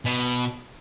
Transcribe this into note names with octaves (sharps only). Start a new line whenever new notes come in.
B2